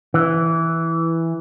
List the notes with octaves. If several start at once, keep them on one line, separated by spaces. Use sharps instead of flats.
E3